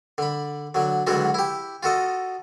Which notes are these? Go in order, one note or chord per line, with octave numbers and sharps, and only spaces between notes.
D3 B5
D3 F#3
C#2 D3 E3 F#3 F4 F#4
E4 G4
F4 F#4 A4 D#5